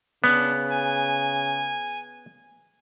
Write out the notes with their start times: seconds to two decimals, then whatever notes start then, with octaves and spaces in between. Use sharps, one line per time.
0.24 C#3 B3 D4
0.72 G#5